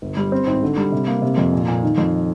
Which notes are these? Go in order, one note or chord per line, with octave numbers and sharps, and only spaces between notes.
G1
G3
C4
G#1
D3
G3
C3
A#3
C3
F2
A#2
A#2
D#3
F2